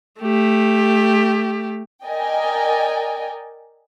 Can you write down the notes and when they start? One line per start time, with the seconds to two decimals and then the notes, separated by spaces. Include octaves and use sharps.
0.21 A3 G4
2.06 A#4 D5 D#5 G5 G#5